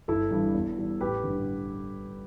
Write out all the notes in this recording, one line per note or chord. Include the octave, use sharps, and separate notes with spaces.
G1 E4 A4
G2 E3 G3
E2
E3 G3
A1 G4 B4
G2 D3